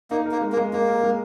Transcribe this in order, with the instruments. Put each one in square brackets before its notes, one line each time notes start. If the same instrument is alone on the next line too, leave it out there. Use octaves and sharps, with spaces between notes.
[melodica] A#3 [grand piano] D#4
[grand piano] A#4
[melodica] A#3
[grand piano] G#3
[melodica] A#3
[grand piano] G#3
[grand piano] G#3 [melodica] A#3
[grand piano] A#4
G#3